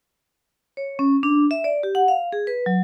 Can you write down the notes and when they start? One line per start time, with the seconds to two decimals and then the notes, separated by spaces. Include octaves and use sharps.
0.77 C#5
0.99 C#4
1.23 D4
1.51 E5
1.64 D5
1.83 G4
1.95 F#5
2.08 F5
2.33 G#4
2.47 B4
2.66 F#3